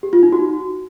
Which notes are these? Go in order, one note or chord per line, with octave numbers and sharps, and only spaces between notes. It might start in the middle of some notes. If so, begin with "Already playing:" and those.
G4
F4
D#4
F#4